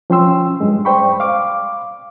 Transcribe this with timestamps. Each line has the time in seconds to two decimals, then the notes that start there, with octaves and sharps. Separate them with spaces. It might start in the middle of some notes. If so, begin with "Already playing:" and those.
0.10 F3 C#4 G5 C6 E6
0.60 G2 G#3
0.85 C5 D5 G5 B5 C#6
1.20 F5 D6